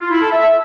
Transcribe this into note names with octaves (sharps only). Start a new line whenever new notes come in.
F4
E4
A4
E5